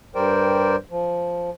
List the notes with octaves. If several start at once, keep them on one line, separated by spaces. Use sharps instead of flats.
G2 G3 A#4 C5 D5 G5
F3